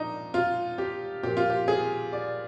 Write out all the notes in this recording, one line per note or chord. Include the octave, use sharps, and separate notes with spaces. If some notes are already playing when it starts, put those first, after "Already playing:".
Already playing: A#2 F3 D4 D#4
F4
G4
A#2 F3 G4
F4
G4
G#4
D5